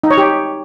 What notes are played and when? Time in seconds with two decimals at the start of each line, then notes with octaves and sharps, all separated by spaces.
0.04 D#4
0.11 C#5
0.18 G4